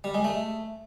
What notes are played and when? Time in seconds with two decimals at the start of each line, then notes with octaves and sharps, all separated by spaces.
0.04 G3
0.14 G#3
0.24 A3